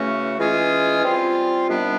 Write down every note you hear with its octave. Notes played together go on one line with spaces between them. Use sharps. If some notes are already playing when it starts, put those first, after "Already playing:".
Already playing: C#3 E3 A3 C#4 F#4
E3 G#3 C#4 F4 G#4
G3 C4 F4
C3 D#3 G3 B3 D4